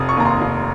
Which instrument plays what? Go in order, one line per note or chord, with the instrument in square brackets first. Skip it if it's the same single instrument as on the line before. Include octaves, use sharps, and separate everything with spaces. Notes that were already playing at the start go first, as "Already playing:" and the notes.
Already playing: [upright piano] F1 D#6
C#6
D#2 A#5
C6
F1